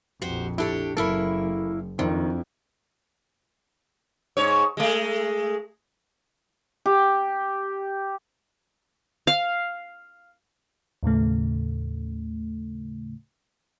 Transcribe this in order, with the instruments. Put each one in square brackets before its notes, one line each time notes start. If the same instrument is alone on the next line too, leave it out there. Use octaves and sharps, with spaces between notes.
[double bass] A#1 F2 [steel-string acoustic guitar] F#4 G4 C5
[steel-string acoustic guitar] D4 G4 C#5 [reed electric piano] E4 A4
[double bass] F#1 [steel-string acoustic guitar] A#3 E4 C#5 [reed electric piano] A4 B5
[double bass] F2 [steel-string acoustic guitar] D#3 [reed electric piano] C4 D4 E4
[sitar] G#2 C#5
G#3 A3
[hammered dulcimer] G4
[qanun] F5
[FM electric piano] D#2 A2 C#3 A3